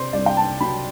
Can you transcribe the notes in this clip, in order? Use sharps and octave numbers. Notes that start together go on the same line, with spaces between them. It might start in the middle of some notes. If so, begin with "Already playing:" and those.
Already playing: C3 C5 D5
C2 D5
G5
A5
F#3 B5